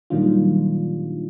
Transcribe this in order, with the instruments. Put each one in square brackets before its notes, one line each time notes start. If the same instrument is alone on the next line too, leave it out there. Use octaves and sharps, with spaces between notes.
[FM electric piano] A#2 D#3 F#3 G3 D4 F4